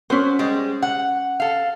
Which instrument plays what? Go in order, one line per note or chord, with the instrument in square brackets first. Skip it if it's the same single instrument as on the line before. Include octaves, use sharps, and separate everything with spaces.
[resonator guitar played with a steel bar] F#3 [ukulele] C#4 C5
[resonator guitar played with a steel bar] G3 G#3
F#5
A4 F5